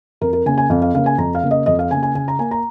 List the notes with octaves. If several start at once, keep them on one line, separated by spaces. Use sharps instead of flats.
F2 A#4
A#4
C#3 A#3 G#5
G#5
F2 F5
F5
C#3 A#3 F5
G#5
F2 A#5
F5
C#3 A#3
D#5
F2 D#5
F5
C#3 A#3 G#5
G#5
C#3 G#5
A#5
A#3 G#5
A#5